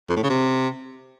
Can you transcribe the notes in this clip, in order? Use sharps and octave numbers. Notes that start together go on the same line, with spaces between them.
F2
A2
C#3
C3